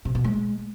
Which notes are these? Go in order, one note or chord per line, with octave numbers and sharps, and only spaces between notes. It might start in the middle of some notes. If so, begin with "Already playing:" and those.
C3
B2
G#3